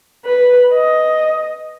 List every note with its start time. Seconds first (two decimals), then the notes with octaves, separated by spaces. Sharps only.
0.25 B4
0.74 D#5